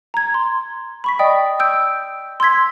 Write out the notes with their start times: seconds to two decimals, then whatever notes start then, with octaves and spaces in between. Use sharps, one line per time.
0.14 A#5 G#6
0.34 C6
1.04 B5 C#6 B6
1.19 D5 D#5 G5 D#6
1.60 E6 G6 D7
2.40 C6 E6 G#6 B6